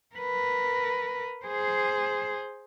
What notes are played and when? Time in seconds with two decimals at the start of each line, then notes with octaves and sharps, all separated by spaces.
0.15 A#4 B4
1.46 G#4 C5